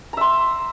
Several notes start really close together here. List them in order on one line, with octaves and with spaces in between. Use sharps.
A#5 E5 C6